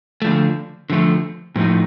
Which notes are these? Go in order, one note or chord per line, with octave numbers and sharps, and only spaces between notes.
D3 F3 A3
D3 F3 A3
A2 F3 A3 D#4